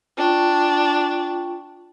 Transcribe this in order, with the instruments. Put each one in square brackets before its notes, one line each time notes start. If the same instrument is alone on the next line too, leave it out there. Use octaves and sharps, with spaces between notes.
[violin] D4 [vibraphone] F4 G5 C#6